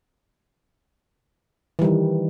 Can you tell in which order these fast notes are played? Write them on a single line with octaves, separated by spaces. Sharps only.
E3 G3 D#3